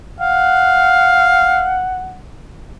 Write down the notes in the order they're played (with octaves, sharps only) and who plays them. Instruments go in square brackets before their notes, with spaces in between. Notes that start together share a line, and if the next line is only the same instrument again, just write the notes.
[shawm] F5 [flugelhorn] F#5